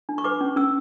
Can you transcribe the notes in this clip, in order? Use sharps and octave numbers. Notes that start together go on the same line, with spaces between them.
D4
C#6
B4 D6
C#4
C#4 E6